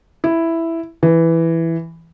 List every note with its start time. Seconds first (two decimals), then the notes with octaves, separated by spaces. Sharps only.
0.24 E4
1.03 E3